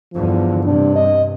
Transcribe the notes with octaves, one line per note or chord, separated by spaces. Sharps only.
E2 G2 D3 F3
G2 C3 D4
D#5